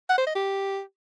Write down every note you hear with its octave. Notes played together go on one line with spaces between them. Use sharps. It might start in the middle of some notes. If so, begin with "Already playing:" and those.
F#5
C5
D#5
G4